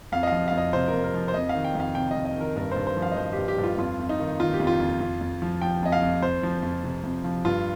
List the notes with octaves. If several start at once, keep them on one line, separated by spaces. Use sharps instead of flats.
F2 F5
D#5
F3 F5
F2 F5
D#5
C3 C5
A#4
F2
A#4
F3
C5
F2 D#5
F5
D#3
G5
F2 F5
C3 G5
D#5
F2
D#5
D#3 A#4
G2 A#4
G2 C5
C5
F3
F5
D#5
F3 C5
G2 G4
G4
G2
F4
F2 F4
F2
D#4
D#3
D#3 F4
G4
F2
F4
F2
F2
F2
F3
F3 G5
F2 D#5
F5
F2
F2 C5
F3
F2
C3
F2
F3
G2 F4